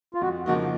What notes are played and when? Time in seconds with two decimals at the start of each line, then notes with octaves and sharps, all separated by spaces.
0.14 F4
0.21 F2 F#4
0.46 C#3 F3 A#3 D#4 F#4